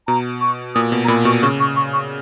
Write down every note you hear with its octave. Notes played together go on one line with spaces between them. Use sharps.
B2 A#5
C#6
A#2 D#6
B2
A#5
A#2 B5
B2 C#6
C#3 C#6
C#6
C#6
C#6